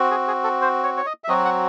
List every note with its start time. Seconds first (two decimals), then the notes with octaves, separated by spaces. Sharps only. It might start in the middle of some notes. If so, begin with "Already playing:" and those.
Already playing: C4 F#4
0.11 G#4
0.28 G#4
0.44 A4
0.62 C5
0.83 C#5
0.97 C#5
1.06 D#5
1.24 E5
1.28 F#3 C4 F#4 D#5
1.45 F#5